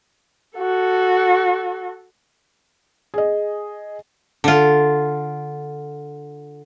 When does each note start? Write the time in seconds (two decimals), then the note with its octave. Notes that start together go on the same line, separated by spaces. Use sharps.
0.58 F#4 A4
3.14 G#4 D#5
4.44 D3 F4